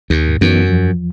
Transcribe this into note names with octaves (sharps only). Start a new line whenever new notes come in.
D#2
G#2
F#2 E3 B3 D#4
E2 F3